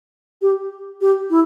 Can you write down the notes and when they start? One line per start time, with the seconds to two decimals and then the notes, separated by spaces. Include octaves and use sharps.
0.42 G4
1.01 G4
1.30 E4